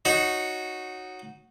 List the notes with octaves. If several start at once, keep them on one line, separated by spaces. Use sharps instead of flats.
D#4 F#4 C#5